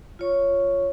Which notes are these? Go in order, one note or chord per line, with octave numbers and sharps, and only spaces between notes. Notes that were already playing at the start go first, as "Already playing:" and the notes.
F4 C#5 C#6